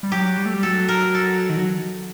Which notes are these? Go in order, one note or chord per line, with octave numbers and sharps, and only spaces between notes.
G3
F#3 G4
G3
A3
G3
F#3 A4
A#4
A4
D#3
F#3